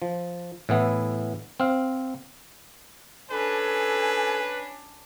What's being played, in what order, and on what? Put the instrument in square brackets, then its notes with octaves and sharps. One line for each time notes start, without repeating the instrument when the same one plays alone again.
[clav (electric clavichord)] F3
A2 E3 B3 E4
C4 F5
[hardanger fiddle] C#4 D4 [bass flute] A4 [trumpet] B4 [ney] G#5